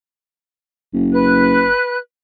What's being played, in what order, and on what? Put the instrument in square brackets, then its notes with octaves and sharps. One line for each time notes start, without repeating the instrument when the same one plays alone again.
[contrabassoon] F#1
[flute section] B4 F#6